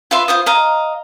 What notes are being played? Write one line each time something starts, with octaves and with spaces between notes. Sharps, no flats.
F4 B4 E5 C6
F4 C5 D#6
D#5 F5 A#5